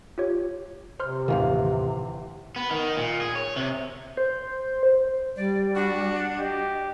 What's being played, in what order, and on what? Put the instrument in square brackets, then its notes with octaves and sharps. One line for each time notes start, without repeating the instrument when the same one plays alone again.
[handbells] F4 G4 C#5
[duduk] C3 [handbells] C5 C6 F6
[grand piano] G1 E3 F5 [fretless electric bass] D#2 A2 D#3
[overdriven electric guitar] B3
D#3
A#2
G#4
C#5
C3
[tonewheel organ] C5
[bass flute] G3 [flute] D5
[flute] D4 [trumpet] F#4
[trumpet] G4 [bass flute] D#5